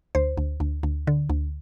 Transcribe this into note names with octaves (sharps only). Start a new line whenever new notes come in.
D2 C5
D2
D2
D2
D3
D2